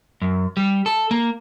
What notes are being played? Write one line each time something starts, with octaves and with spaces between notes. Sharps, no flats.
F#2
G3
A4
A#3